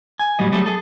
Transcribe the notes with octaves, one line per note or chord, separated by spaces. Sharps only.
G#5
A2 F#3 G3 D#5
F#3 G3 A3 C4 G#4 A4
G#4 A4